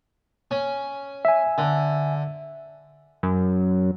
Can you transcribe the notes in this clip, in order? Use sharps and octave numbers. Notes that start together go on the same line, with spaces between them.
C#4
E5 G#5
D3
F#2